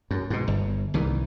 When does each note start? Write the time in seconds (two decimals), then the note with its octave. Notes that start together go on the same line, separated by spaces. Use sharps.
0.11 F#2
0.30 G#2 B2
0.48 G1
0.94 C2 D#3 E3